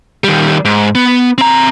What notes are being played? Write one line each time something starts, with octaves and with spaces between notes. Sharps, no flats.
D#3 G3
G#2
B3
C4 A#5